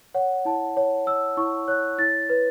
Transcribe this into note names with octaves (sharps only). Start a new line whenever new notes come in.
C#5 F#5
E4 A5
C#5
C#5 E6
E4 C#6
C#5 F#6
E4 A6
B4